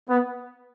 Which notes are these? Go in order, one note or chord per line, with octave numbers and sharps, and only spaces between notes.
B3